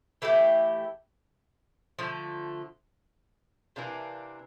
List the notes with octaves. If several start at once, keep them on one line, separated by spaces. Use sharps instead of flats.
E3 A3 E4 G4
D3 F3 A3
C3 E3 A#3 D4